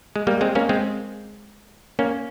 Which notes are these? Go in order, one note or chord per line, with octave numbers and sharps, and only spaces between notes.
G#3
G3 A#3
G#3 C4
A#3 C#4
G#3 C4
A#3 C#4